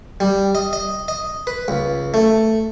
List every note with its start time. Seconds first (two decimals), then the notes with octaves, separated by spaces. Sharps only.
0.20 G3
0.55 D#5
0.73 D#5
1.08 D#5
1.47 B4
1.68 C#2
2.14 A3